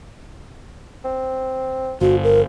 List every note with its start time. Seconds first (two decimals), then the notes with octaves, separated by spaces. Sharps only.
1.05 C4
2.01 G1 F3 F#4
2.24 A#4